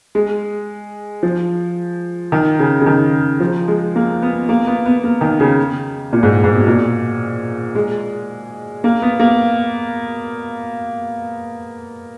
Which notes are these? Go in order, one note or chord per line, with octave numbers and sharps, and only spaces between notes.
G#3
F3
D#3
C#3
C#3
D#3
F3
G#3
A#3
B3
A#3
B3
B3
A#3
D#3
C#3
A#2
G#2
G#2
B2
A#2
G#3
A#3
B3
A#3